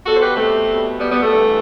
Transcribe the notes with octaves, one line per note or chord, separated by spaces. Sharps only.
B2 G3 F#4 A4
C5
G4 B4
A3 C4
B2 G3
G3 B3
G3 B3
A3
G2 E3 G3